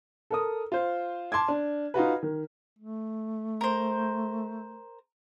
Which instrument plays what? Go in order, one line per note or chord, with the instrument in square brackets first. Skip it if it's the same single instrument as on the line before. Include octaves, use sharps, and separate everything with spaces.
[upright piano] A4 A#4 D#6
F4 C5
A5 C6 D6 G#6
D4
D#4 F4 F#4 B4
D#3
[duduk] A3
[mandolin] A#4 C5